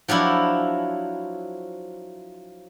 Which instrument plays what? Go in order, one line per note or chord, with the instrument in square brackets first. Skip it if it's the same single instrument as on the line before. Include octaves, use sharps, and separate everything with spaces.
[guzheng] F3 F#3 D4 E4